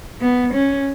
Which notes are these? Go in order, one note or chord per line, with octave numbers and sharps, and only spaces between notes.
B3
C#4